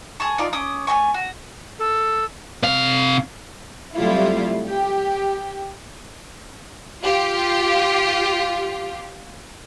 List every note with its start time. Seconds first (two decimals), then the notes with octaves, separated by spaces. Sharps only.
0.20 G#4 A5 C#6
0.38 D#4 F4 D5 D6
0.53 C#4 D6 D#6
0.87 A3 A#3 G#5 C#6
1.14 F#4
1.79 A4
2.63 C3 F5
3.96 C3 F#3 G3 A3 E4 F4
4.68 G4
7.03 F4 G4